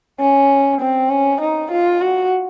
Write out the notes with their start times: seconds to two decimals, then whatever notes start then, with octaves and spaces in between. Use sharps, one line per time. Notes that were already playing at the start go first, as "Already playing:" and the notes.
0.19 C#4
0.81 C4
1.10 C#4
1.41 D#4
1.71 F4
2.01 F#4